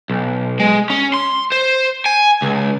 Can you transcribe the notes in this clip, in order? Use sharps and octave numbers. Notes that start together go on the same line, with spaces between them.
B1
G#3
C#4
C6
C5
G#5
C#2